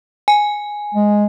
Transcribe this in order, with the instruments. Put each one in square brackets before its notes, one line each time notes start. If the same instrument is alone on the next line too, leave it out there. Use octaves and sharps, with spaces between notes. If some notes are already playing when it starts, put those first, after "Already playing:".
[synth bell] G#5
[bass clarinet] G#3